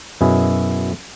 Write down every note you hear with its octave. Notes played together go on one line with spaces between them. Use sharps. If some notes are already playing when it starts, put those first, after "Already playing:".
F#2 B2 E4 G#4 E5